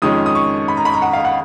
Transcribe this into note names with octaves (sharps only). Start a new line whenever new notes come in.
F2 D#3 G#3 C#4 D#6
D#6
C#6
B5
A#5
B5
A#5
F#5
F5
F#5